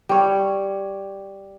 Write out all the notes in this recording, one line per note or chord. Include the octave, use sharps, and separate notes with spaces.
G3 C#5